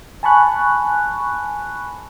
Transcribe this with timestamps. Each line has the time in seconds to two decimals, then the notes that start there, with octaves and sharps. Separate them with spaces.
0.23 G#5 A5 B5 C#6 F#6